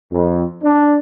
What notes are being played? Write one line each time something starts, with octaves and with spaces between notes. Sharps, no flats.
F2
D4